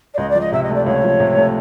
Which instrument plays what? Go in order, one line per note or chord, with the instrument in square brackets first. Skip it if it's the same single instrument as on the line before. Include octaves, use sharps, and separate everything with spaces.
[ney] D5
[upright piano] C#2 [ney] D#5
[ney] D5
[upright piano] F3
[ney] D#5
[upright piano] C3 [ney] E5
[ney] D#5
[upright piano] A3
[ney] D5
[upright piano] C#2 [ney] C#5
[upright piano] F3
C3
A3